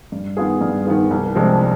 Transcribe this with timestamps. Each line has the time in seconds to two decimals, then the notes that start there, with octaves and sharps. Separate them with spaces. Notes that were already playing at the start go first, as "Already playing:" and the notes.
0.12 G2
0.37 D#3 B3 F4 G#4
0.61 G2
0.87 D#3 B3 F4 G#4
1.11 C2
1.35 C3 F3 G#3 D4